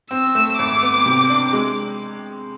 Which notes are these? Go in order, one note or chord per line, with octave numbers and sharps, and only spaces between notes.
C4 E6
A3
G#1 D6
B3
C3
D4
G#3